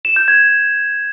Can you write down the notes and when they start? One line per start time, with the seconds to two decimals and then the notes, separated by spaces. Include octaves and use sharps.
0.05 E7
0.16 G6
0.28 G#6